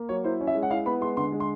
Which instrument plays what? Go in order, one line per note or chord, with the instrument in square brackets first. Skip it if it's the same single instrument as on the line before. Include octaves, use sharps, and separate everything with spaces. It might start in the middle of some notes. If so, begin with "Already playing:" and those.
Already playing: [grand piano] A#3
F#3 C#5
E4 C5
C#4
E5
G#3
F#5
E4 F5
B3 B5
G#3 C6
D3 C6
G#3
C6